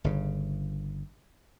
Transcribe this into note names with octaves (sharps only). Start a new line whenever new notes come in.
G1 C#3